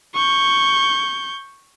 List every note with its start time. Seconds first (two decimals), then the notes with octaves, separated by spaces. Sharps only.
0.14 C#6 G6